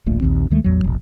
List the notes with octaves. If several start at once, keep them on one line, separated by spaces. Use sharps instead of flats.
D1 A#1 A#2 A3
A#1 D#2 C4
D2 D#3 G#3 A3
A1 E2 F#3
E1 A#1